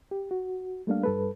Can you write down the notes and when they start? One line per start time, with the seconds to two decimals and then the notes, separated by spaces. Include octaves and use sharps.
0.11 G4
0.31 F#4
0.87 G3 A3 A#3 D4 F5
1.03 G2 A4 B4